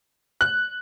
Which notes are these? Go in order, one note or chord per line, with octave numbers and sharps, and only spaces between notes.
F#6